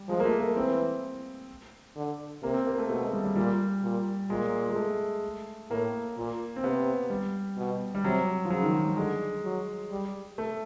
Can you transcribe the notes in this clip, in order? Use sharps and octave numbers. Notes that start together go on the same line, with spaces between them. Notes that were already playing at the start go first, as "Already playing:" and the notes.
Already playing: G3
F3 G#3
A#3
A3
A#3
E3 C4
D3
C3 A#3
C4
A#3
A3
B2 A3
G#3
G3
G3
A#2 G3
A#2
A#2 G#3
G#3
A3
A2 A#3
A#2
C4
C3 B3
G3
B2
G3
C3 F#3
F3
C#3 F#3
D#3
F#3
G3
D3 G#3
F#3
G3
A3